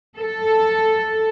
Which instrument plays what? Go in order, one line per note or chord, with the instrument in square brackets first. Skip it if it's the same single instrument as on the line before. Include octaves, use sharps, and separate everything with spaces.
[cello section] A4